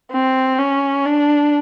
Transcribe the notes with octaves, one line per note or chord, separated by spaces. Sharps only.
C4
C#4
D4